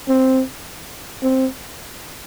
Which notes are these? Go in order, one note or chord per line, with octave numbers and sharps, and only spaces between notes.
C4
C4